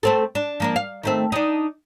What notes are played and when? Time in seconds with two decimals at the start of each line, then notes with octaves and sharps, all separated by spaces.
0.03 A3 C4 A4
0.35 D4
0.60 F3 A#3 D4
0.76 F5
1.03 D#3 A3 C4
1.32 D4 D#4